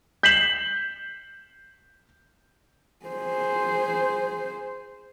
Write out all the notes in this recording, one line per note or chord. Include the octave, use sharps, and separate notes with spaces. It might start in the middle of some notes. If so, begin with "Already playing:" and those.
G6 B6 C7 E7 F#7
G#4 C5